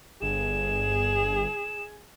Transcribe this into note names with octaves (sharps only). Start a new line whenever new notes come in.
G1 G#4 E7